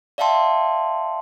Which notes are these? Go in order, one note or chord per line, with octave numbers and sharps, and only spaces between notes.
D5 E5 F5 G5 A5 C6